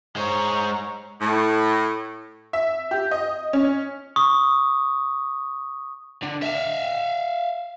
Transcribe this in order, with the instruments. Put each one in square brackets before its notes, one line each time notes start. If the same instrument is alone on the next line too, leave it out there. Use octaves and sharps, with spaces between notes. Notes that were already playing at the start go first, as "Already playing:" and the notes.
[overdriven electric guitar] G#3 C5 [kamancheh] C#5 A#5
[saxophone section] A2
[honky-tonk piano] E5
G4
D#5
C#4
[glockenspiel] C#6 D#6
[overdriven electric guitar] D3
E5 F5